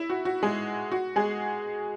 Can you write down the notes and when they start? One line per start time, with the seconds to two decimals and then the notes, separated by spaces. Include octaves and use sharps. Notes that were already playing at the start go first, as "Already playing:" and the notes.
Already playing: E4
0.10 F#4
0.25 F#4
0.43 G#3 G#4
0.92 F#4
1.16 G#3 G#4